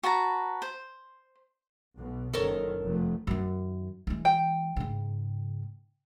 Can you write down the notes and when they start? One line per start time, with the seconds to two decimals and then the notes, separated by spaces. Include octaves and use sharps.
0.03 F#4 B4 A5 A#5
0.62 C5
1.98 B1 B2
2.33 F#1 D#3 A4 A#4 C#5
2.83 F1 F2 A3
3.27 F#2 D#3
4.07 E3 G#3
4.25 G5
4.76 G#2 C#3